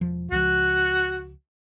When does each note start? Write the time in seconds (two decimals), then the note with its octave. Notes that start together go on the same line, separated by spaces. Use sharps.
0.01 E1 F3
0.32 C#2 F3 F#4